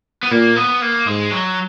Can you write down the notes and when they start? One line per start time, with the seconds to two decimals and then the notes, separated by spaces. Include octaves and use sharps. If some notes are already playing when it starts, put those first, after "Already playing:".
0.23 B3
0.31 A#2 A#3
0.56 B3
0.82 A#3
1.07 G#2 G#3
1.32 F#3